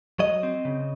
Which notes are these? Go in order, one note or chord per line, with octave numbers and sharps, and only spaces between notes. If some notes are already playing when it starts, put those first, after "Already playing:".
F#3 D#5
C4
C#3